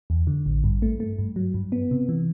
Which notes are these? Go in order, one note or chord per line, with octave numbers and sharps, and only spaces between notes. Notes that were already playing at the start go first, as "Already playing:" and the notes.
E2
D3
A1
G2
A3
A3
G2
F#3
G2
B3
C3
E3